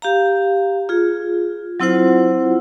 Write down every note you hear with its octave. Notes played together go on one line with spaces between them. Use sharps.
G4 F5 A#5
F4 G#4
F#3 C4 E4 F4 C5 F#5